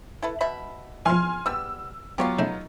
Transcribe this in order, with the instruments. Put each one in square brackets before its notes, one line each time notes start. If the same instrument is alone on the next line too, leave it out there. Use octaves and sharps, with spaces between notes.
[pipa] E4 A4 B4
B2 E5 B5
[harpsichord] E3 F3 [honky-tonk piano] G#5 C6 F6
[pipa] G3 B3 [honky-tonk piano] E6
[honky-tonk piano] F#3 B3 F4 [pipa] G4 C#5 F5
[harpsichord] C#3 A3 [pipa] D#4